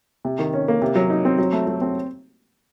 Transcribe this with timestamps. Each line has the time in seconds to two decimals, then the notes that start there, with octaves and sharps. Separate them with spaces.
0.25 C3
0.39 D#3
0.54 C#4
0.68 A#3
0.82 C3
0.95 F#3
1.10 D#4
1.25 C4
1.38 F#3
1.52 A3
1.67 F#3
1.81 C4